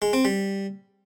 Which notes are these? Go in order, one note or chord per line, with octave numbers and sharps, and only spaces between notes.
G#3
C4
G3